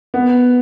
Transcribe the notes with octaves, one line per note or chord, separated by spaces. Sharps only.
B3